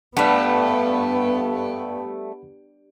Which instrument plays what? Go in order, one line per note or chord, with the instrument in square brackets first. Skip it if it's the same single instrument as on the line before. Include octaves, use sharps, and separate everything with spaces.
[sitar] G2 [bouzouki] G3 A3 [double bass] B3 [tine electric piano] F#5 B5